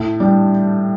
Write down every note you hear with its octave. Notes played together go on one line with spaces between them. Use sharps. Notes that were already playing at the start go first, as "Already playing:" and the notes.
Already playing: A2
G3 D4